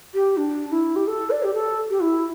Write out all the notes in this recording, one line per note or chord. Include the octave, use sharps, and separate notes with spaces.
G4
D4
E4
G4
A4
D5
G4
A4
G4
E4